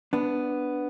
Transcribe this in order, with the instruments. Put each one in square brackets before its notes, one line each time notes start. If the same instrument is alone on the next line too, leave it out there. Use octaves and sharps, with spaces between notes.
[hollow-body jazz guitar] B3 D4